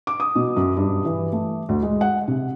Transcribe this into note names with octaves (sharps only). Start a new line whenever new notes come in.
D6
D#6
B2
F#2
G2
E3
A3
D2
G#3
F#5
C3